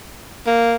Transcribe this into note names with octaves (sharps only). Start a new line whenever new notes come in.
A#3